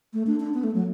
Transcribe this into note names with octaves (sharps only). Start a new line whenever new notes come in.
A3
D4
D4
B3
A3
F#3